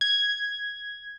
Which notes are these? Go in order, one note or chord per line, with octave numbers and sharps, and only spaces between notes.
G#6